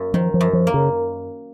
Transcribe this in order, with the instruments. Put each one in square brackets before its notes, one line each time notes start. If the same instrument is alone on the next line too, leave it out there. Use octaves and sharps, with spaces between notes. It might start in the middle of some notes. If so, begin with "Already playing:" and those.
Already playing: [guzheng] F#2 A#3
[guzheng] D#3 [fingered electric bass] F3
[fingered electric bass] F3
[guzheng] F#2
[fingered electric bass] F3
[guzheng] A#3
[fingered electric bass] C#3